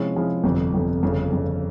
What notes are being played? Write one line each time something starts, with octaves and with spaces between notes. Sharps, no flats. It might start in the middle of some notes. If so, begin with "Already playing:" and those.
Already playing: C3 F3 G#3 C#4 E4
C3 F3 G#3 C#4 E4
G1 F2 C3
G1 F2 C3
G1 F2 C#3
G1 F2 C#3